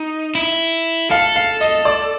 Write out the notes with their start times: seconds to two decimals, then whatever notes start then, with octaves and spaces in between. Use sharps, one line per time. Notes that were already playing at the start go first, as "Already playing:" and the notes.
Already playing: D#4
0.35 E4
1.11 A4 F5
1.36 F5
1.61 D#5
1.85 D5